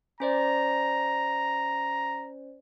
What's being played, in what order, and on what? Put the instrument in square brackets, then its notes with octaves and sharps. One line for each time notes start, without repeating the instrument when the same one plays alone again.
[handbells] C#4 C5 D5 [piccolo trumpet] A#5